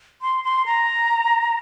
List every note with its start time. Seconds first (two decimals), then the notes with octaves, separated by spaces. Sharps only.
0.22 C6
0.44 C6
0.66 A#5